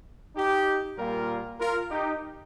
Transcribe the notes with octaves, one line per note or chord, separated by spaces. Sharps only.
D#4 G4
A#2 G3 A#3 F4 A#4
F4 A#4
D#4 G4